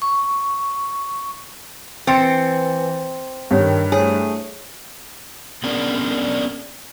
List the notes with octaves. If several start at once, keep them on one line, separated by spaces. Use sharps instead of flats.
C#6
E3 C4 A6 C#7
G2 D#3 G4 A4 C#5
A3 E4 G#4 C5 C#5
B3 C#4 D4 G#4 A#4 D5